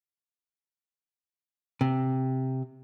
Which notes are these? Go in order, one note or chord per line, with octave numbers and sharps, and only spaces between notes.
C3